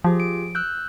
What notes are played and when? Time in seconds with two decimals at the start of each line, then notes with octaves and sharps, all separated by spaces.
0.04 F3 F4 G4 G#4
0.20 D7
0.55 E6 F#6 G6